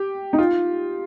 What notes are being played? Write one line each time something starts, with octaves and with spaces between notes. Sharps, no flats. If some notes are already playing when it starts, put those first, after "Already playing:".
Already playing: G4
D#4
F4